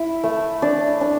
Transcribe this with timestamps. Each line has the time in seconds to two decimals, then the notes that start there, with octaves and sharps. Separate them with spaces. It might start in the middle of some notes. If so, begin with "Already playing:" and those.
Already playing: E4
0.23 A3 E5
0.62 D4 D5
1.01 D4